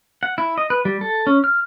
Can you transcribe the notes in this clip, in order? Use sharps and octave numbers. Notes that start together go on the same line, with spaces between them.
F#5
E4
D#5
B4
G3
A4
C#4
F6